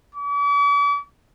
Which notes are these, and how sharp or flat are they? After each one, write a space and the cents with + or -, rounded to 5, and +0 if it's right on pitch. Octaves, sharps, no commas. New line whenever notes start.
D6 -45